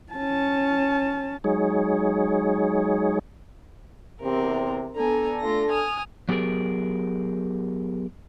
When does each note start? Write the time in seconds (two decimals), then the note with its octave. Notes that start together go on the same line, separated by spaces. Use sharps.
0.13 C#4 A5
1.44 F#3 G#3 D#4 G#4 C#5
4.22 E2 C3 C4 A#4
4.96 B3 D4 A4 G#5 A#5
5.40 A3 F4 A#6
5.70 G#5 D#6 F6
6.29 F#3 B3 G4 G#4 A#4